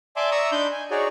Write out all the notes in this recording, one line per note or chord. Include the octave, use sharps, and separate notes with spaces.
D5 E5 G#5 A5 C6 D6
D5 E5 A#5 C#6 D#6 E6
D4 D#4 B5 C6 D6 G6
G#5
D#4 F#4 G#4 C#5 D5